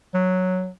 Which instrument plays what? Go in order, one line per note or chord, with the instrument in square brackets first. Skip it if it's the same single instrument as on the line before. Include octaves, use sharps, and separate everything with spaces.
[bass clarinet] F#3